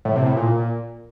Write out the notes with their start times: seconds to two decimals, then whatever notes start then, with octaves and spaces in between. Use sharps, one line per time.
0.05 A2
0.16 C3
0.26 A2
0.37 A#2